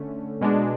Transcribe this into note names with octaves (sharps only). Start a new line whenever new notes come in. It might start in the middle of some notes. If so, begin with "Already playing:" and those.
Already playing: D3 A3 C#4
B2 G#3 D4